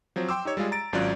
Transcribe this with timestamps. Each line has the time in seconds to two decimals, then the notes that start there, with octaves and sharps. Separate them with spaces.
0.16 F3 F#3 C4
0.29 G5 C6 D6 E6
0.45 D#4 G4 C#5
0.57 G3 G#3 F4 G#4
0.72 A#5 A6 D7
0.93 G#1 F#3 C#4 F4 D5 F#6